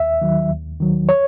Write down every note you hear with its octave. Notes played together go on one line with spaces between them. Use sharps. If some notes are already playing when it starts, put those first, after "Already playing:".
Already playing: D#2 E5
D#3 F#3
D#2
D#3 F#3
C#5